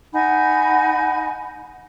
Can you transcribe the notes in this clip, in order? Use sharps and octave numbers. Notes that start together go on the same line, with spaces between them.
D#4 F#5 G#5 B5